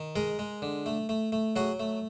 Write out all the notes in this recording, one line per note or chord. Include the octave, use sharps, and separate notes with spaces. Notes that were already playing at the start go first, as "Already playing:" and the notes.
Already playing: D#3
G#3 G#4 A#4
G#3
D3
A3
A3
A3
F#3 F#4 G#4
A3